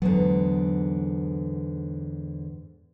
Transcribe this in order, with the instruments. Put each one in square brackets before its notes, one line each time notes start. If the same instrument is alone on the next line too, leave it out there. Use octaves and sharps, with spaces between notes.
[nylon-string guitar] E2 G#2 D3 [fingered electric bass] F#3